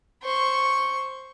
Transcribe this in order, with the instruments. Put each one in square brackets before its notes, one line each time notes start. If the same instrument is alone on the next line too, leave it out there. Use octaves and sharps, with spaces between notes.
[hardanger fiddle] C5 C#6